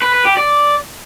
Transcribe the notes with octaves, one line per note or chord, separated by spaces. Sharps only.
B4
B4
G4
D5